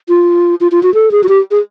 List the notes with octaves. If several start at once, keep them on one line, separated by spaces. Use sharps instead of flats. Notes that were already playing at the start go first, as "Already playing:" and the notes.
F4
F4
F4
F#4
A4
G#4
F#4
G4
G#4